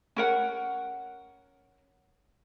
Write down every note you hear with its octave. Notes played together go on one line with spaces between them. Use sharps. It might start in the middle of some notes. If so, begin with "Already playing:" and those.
C#4 A#4 F#5